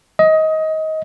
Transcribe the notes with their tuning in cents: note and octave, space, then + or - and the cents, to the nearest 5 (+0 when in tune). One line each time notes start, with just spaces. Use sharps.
D#5 +20